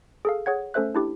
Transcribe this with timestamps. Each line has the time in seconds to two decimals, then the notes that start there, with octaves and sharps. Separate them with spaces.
0.25 G#4 A4 F5
0.46 G#4 C#5 F#5 G#6
0.74 A3 C#4 A4 C5 E5 F#6
0.95 D4 E4 G4